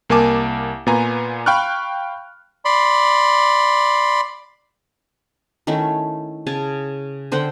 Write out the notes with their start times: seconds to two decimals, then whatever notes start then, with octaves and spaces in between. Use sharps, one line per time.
0.10 C2 A#3 A#4 G#5 A5 D6
0.87 A#2 B3 F4 B4 G#5 A#5
1.46 F5 G5 B5 C#6 F6 F#6
2.65 D5 B5 C6
5.67 D#3 A3 C#4 E4
6.47 C#3 G#5 A5
7.32 D3 C5 F#5 G5